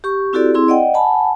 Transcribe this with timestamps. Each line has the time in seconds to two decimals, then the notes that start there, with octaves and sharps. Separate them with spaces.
0.04 G4 C#6
0.33 C4 E4 F#4 G4 A4 D5
0.54 C4 E4 G#4 C6
0.68 D5 D#5 F#5 G5
0.94 F#5 G#5 A5 B5